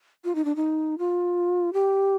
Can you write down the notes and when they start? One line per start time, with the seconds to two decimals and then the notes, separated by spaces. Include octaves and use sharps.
0.24 F4
0.35 D#4
0.45 D4
0.56 D#4
0.98 F4
1.73 G4